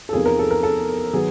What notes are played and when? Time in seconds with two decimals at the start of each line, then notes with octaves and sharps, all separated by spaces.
0.09 A4
0.13 E2 C3 F3 A#3 D#4 G#4
0.26 A#4
0.39 A4
0.51 A#4
0.63 A4
1.13 D#3 F#3 B3 G#4